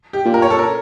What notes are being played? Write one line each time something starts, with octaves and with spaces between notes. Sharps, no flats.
G4
A#2
A#4
C#5
A4
A#4